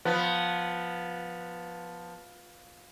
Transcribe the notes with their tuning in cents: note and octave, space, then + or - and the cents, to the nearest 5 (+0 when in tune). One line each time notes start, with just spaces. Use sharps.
F3 +15 B3 +0